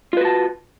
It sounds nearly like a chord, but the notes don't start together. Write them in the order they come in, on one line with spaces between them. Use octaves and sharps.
F4 B4 F#4 A5